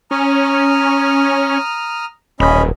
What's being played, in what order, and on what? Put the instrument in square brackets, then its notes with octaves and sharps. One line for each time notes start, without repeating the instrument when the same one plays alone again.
[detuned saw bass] C#4 [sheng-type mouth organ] A#5 D#6 F6
[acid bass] D#1 [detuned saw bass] B1 [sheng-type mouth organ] C#4 D#5 B5